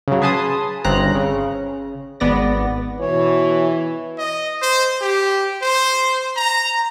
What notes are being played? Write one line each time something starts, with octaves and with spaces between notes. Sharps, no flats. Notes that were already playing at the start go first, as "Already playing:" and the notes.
C#3 F#3
G#4 B4 A5 C6 D#6
G1 C#3 C4 A#5 F#6
C#3
G#1 B3 D5 A#6
B2 E3 C#5
D#5
C5
G4
C5
A#5